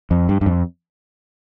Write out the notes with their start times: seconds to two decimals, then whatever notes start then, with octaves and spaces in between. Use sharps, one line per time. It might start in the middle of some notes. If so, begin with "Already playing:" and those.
0.11 F2
0.29 G2
0.41 G2
0.46 F2